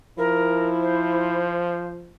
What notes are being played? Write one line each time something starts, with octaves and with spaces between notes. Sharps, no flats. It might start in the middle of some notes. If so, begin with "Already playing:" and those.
F3 E4 A#4
C5